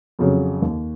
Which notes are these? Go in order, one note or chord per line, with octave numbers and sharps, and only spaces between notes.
F2 C#3 F#3
D#2